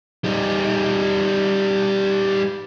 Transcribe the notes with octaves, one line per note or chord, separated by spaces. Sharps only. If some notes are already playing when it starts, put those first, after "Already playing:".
G3 D#4